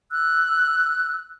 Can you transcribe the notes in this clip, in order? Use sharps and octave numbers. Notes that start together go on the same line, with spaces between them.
E6 F#6